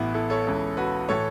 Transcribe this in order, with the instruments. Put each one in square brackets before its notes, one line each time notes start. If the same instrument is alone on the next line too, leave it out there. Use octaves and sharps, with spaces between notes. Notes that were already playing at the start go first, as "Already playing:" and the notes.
Already playing: [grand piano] A1 A2 E3 B3 E4
E4 A4
A4 C#5
C#2 C#3 E3
F#4 B4
A2 E3 A4 C#5